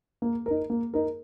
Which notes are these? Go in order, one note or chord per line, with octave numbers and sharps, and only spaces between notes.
A#3
D#4 A#4
A#3
D#4 A#4